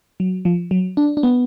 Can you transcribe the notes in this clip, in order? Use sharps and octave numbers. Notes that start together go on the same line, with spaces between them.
F#3
F3
F#3
D4
D4
B3